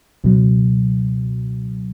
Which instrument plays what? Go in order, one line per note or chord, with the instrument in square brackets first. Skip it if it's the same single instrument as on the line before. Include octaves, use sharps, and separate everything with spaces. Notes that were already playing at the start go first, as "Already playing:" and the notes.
[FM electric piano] C#2 B2 F#3